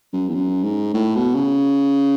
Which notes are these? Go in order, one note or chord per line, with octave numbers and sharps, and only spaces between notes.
F#2
E2
F#2
G#2
A2
B2
C#3